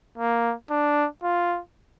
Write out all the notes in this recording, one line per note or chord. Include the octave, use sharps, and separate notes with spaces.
A#3
D4
F4